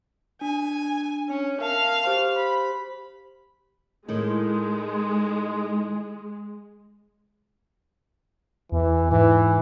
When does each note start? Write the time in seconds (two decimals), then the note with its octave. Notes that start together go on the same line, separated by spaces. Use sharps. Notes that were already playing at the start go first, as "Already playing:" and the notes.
0.41 D4 G#5
1.29 C#4
1.61 A#4 E5 F5 A5
2.04 G4 C5 C6
2.36 B5
4.08 A2 D#3 G#3
8.72 E2 E3
9.12 G#2 E3